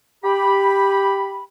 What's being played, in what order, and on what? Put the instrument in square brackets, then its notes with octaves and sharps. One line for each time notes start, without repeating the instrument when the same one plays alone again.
[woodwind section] G4 B5